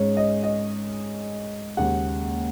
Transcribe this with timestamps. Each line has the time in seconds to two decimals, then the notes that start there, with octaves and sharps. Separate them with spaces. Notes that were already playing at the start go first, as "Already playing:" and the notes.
Already playing: G#2 G#3 C#4 C#5
0.17 D#5
0.43 D#5
1.77 D#2 C#3 G#3 F#5